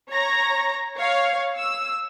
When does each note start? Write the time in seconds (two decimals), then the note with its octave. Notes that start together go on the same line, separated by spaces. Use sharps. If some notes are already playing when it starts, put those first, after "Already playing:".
0.10 C#5 A#5 A#6
0.98 C#5 F5
1.57 E6